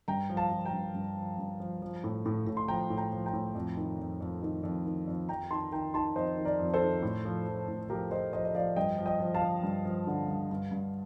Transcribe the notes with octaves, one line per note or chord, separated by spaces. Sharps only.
G2 G5 A#5
F3
F5 A5
F3
G5 A#5
G2
G2
F3
G2
F3
F3
A2
A2
A2
C6
F3 G5 A#5
A2
G5 A#5
F3
G5 A#5
A2
F2
D#3
F2
F2
D#3
F2
D#3
F2
F2 G5 A#5
D#3 A5 C6
D#3 G5 A#5
D#3 A5 C6
F2 C5 D#5
D#3
A#4 D5
F2
A4 C5
D#3
A2
F3
F3
A2
F3 G4 A#4
F3 C5 D#5
F3 C5 D#5
D#5
F3 D5 F5
G2 D#5 G5
F3
D#5 G5
F3
F5 A5
F3
G2
F3
D3
G2
G2
G2